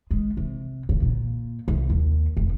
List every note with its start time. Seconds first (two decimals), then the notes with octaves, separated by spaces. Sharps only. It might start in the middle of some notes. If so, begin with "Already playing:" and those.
0.11 G#3
0.37 C3
0.89 C#3
1.02 A#2
1.68 C2
1.90 D#2
2.37 F1